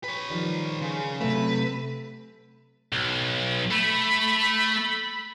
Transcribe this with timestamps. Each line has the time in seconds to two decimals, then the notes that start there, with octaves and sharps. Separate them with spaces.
0.04 B4 C#5
0.30 D#3 F3 G3
0.81 C#3
1.21 C3 F#3 A3 B4
2.93 B1
3.71 A3 B5